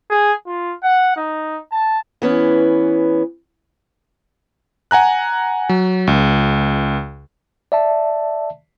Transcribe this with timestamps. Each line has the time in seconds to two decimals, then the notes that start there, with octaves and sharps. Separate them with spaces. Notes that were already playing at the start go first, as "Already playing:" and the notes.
0.10 G#4
0.47 F4
0.84 F#5
1.17 D#4
1.72 A5
2.22 E3 B3 C#4
4.91 F#5 G#5 A#5 F#6
5.69 F#3
6.07 C#2
7.72 D5 E5 A5